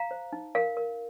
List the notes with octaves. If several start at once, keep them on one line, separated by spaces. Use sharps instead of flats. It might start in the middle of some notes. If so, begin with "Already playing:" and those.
Already playing: F5 A#5
C5
D#4
A#4 F5
A#4